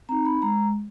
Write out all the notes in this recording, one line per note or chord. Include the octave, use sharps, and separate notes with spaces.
C4 D#4 A#5
B5
G#3 A#5